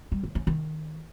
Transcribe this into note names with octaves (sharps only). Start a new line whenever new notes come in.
G3
D#3
C#4
D#3